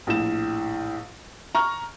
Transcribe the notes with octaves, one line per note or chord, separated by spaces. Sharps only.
A#1 A2 E7
A#5 C#6 F6